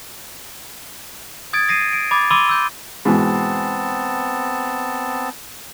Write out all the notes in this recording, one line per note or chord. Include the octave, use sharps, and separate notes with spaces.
D#6 G#6 A6 D7
D#6 A#6 C7 D#7
D7
B5 D6 G#6 A6
B5 C6 D6 E6 D#7 G7
E6 G6
G#2 B2 E3 B3 C4 A5